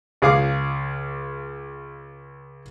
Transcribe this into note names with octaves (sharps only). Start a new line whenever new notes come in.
C#2 G#4 F5 D6